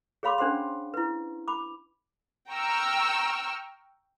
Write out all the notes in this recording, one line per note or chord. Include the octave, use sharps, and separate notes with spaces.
G#4 C#5 F5 B5 C6 D6
C#4 D4 C5 F#5 C6
E4 B4
B5 D6
G5 A#5 C#6 E6 F6